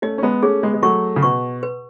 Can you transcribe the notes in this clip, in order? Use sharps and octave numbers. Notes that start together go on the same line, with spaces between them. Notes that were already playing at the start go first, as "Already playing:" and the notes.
A3 C#4 D#5
C#4
G#3 B3
A3 C#4 G#4
G#3 B3
G#3
F#3 A3 C#6
C#3
B2 C#6
B4